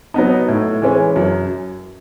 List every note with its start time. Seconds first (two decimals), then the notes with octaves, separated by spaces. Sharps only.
0.14 F#3 B3 D#4
0.48 A2
0.82 E3 G#3 C#4
1.16 F#2